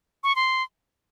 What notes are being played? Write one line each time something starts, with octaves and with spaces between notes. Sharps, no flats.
C#6
C6